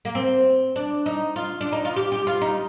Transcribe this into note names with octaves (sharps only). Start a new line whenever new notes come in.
A#3
C4
D4
D#4
F4
D4
D#4
F4
G4
G4
F4
D#4